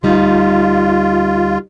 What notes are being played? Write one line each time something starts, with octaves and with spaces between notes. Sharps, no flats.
D2 G3 D#4 F4